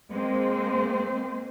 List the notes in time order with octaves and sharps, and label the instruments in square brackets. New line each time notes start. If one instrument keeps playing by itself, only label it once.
[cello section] G#3 A#3 C4 C5